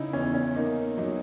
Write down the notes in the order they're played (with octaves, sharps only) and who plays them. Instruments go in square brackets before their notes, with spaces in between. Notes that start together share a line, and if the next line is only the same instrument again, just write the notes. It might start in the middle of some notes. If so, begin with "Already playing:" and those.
Already playing: [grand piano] C#3 [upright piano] D#4 E4
[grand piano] E2 [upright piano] C#4
[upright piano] C#4
[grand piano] A#3 [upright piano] D#4
[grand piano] F#3 [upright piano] D#4